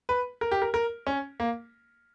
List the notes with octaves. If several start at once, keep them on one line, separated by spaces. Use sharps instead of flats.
B4
A#4
G4
A#4
A#4
C#4
A#3